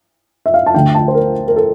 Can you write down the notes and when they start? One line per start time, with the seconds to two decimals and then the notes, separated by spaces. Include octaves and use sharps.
0.46 E5
0.54 F5
0.66 A5
0.74 D2 D3 A3 D4 G5
0.95 A5
1.08 C5
1.15 A#4
1.48 A#4
1.56 A4